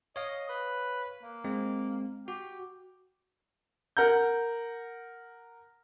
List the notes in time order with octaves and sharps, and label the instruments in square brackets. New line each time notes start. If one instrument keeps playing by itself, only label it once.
[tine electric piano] C#5 F5 [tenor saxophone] D#5
[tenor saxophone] B4
A#3
[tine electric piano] G#3 C4
[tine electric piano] F#4 [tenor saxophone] G4
[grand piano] A#4 F#5 A#5 G6